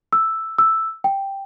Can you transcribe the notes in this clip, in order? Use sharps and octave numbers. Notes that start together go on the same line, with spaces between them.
E6
E6
G5